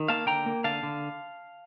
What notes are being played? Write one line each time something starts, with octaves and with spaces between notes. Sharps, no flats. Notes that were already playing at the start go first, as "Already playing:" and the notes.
Already playing: D#3
A#3 F5 A5
D3 G5 A#5
A#3
D3 F5 A5
D3